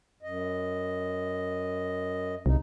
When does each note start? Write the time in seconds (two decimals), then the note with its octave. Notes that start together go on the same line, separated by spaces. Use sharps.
0.23 F#2 D#5
2.46 C2 C#3 D#4